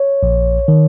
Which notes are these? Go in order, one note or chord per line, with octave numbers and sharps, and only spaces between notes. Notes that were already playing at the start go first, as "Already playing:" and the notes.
Already playing: C#5
A#1
D#3